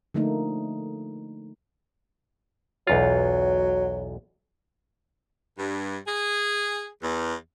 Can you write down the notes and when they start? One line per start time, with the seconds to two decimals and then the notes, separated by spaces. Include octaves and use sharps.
0.14 D3 F3 A3 A#3 D#4
2.87 B1 E2 F#3 F4
5.56 G2
6.06 G#4
7.02 E2